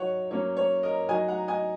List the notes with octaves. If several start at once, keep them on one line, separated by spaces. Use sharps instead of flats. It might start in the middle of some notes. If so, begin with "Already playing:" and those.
Already playing: F#3 D#4 C#5 F#5
F#3 A#3 C#4 C#5
C#5
A#4 D#5
F#3 D#4 D#5 G#5
F#5 A#5
D#5 G#5